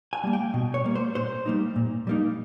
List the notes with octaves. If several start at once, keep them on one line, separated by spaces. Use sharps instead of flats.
G#5
G3 A#3
G5
B2
C#5
G3 A#3
C5
A#2 C5
G3 A#3 D#4
A#2
G3 A#3 D#4